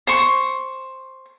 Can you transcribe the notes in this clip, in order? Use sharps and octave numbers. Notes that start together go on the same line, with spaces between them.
C5 C#6